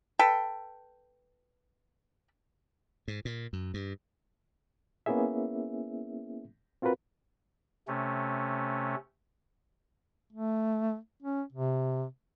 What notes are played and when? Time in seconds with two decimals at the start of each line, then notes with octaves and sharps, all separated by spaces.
0.19 A4 B4 G5
3.08 G#2
3.25 A#2
3.53 F#2
3.74 G2
5.06 A#3 B3 C#4 E4 G#4 E5
6.82 C4 F4 F#4 A#4 B4
7.88 C3 A3 C#4
10.33 A3
11.23 C#4
11.52 C3